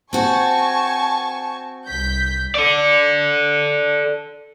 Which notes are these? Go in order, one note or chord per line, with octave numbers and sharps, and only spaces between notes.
C4 F#4 G#5 A5 C#6
C2 G6 B6
A4 D5